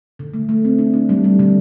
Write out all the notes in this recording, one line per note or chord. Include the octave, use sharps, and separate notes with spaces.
D3
A3
A3
C4
D4
D4
G3
G3
D3